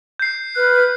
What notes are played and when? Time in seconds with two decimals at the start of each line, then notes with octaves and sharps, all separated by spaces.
0.20 G6 C7
0.56 B4 F6 F#6